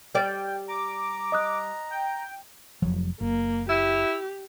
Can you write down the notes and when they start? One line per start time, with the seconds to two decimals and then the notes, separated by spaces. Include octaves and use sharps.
0.15 G3 D5 G5
0.68 A#5 D6
1.32 D#5 D#6 F#6
1.90 G5
2.82 F1 F3 F#3
3.21 F#1 A#3
3.69 E4 G4